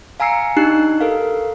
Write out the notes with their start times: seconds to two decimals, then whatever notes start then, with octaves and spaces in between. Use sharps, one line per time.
0.20 F5 G#5 A#5 E6 C7 C#7
0.57 D4 D#4 G4 F#6 C7
1.00 A4 A#4 F5